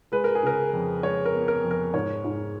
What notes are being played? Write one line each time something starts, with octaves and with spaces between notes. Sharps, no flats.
G#3 B4
A#4
G#4
C#3 A#4
F2
G#3 C#5
A#4
B3
A#4
F2
A#4
G#2 C#5
G#2